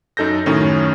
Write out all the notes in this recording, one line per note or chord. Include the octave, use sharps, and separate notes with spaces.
F#2 D#4 A4 G6 A#6
F#2 A2 D#3 C#4